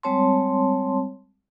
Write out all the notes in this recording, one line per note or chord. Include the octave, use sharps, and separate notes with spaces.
G3 G#3 C4 C#5 A5 C6